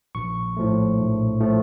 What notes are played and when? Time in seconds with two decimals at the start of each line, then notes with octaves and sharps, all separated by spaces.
0.15 A#1 C#6
0.57 A2 F3 A3
0.98 A#1
1.40 A2 F3 A3